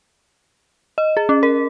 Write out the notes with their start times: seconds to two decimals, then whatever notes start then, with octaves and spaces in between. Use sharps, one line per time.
0.98 D#5
1.17 G#4
1.29 C#4
1.43 A#4